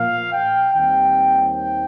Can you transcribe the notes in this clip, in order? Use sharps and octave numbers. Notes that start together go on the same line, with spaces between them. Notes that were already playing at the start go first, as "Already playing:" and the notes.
Already playing: A#2 F3 A#3 F5
G5
D#2 D#3 G3 C4 G5
G5